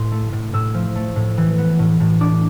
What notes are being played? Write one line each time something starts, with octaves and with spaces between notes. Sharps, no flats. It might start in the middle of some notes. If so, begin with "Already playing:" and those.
Already playing: A2 C6
A3
A2
A2 E6
F3
A3
A2
E3
B3
A2
A2
D4 D6